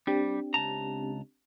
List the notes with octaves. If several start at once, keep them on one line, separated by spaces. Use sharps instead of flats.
G3 C4 D4 G4
C#2 A5 A#5